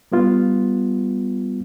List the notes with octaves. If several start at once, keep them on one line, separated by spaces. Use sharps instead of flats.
G3 B3 F4